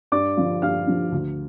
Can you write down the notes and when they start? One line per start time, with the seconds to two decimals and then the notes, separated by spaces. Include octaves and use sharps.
0.12 G2 D5 D6
0.37 D3 F3
0.62 G2 F5 F6
0.87 D3 F3
1.12 D2